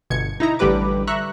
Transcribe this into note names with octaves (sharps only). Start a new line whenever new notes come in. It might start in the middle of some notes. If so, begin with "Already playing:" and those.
G1 B2 G#6 C#7
D#4 E4 A#5
A1 D3 G3 G4 B4 D6
E5 A#5 C#6 F#6